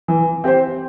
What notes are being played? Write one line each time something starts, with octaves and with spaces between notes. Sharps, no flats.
E3
C4 G4 C5